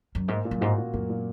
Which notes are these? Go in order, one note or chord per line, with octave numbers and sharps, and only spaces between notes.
F#2
G#2 A#3
A#2
F#2
G#2 F#4
A#2
F#2 A#3
A#2